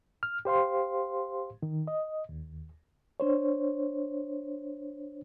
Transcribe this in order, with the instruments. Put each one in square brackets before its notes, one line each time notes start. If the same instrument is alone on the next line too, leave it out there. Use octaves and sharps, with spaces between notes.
[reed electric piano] F6
G4 C5 F5 C6
D#3
D#5
D#2
D4 C5 C#5